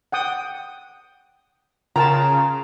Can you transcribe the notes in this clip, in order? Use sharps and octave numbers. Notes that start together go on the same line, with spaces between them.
F#5 G5 D#6
C#3 F4 A#4 G5 A5 A#5